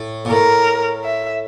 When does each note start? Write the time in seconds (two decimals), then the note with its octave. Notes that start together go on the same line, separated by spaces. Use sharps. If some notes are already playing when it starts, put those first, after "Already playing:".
Already playing: A2
0.25 A#2
0.30 A2 A#4
1.04 E5